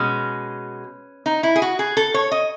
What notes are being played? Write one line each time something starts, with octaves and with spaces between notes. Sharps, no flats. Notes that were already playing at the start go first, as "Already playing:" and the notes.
Already playing: B2 G#3 C#4
D#4
E4
G#4
F#4
G#4
A4
C#5
D#5